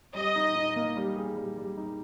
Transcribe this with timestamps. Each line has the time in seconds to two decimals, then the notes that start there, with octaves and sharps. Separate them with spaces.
0.15 G3 D#5
0.35 D#4
0.55 D#4
0.76 A#3
0.96 G3
1.16 G#4
1.36 G3
1.57 G3
1.77 D#4